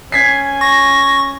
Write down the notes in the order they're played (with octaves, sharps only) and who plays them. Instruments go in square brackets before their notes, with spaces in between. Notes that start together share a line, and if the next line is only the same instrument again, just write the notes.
[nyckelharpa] C#4 G#5 [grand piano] G#6 B6 C7
[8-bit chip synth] C#6 [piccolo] A#6